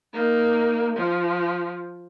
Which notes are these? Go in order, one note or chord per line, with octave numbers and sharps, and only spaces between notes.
A#3 D#4
F3